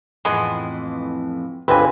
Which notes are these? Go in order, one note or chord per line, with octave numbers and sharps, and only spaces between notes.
F2 A2 E3 G#3 B3 G#4 D#5
G1 C#2 D3 C4 B4 G#5